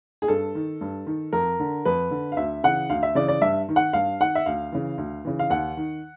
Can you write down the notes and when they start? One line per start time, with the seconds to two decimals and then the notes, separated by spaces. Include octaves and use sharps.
0.22 G#4
0.28 G2 A4
0.55 D#3
0.81 G2
1.07 D#3
1.33 F2 A#4
1.60 D3
1.85 F2 B4
2.11 D3
2.32 F5
2.37 D2 E5
2.63 C#3 E3 F#5
2.90 D2 F5
3.03 E5
3.15 C#3 E3 D5
3.28 D5
3.41 G2 E5
3.69 D#3
3.76 F#5
3.93 G2 F5
4.20 D#3 F#5
4.35 E5
4.46 D2 F5
4.72 C#3 E3
4.98 D2
5.25 C#3 E3
5.39 F5
5.50 D#2 F#5
5.77 D#3